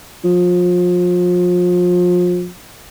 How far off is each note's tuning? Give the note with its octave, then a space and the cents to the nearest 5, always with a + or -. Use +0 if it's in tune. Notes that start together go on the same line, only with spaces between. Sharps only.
F3 +30